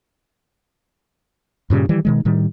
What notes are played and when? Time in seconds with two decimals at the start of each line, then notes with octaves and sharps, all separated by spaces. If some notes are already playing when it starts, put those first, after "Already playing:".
1.70 G2 A#2 C#3 G3
1.89 D#3 E3 G3
2.05 B2 D#3 G#3
2.25 A2 D#3 G3